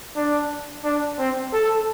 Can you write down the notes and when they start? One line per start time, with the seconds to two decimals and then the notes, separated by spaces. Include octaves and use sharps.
0.16 D4
0.84 D4
1.19 C4
1.53 A4